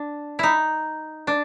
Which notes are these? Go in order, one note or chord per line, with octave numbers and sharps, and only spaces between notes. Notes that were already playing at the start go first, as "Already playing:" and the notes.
Already playing: D4
D#4 E4
D4